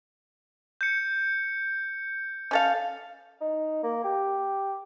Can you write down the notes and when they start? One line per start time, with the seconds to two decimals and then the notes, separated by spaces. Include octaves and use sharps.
0.81 G6 C#7
2.51 C#4 A4 F5
3.41 D#4
3.83 A#3
4.04 G4